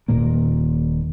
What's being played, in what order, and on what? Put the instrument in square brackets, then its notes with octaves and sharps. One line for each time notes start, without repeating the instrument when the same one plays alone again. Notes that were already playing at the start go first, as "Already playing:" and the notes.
[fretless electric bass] D#1 A#2 D#3 A#3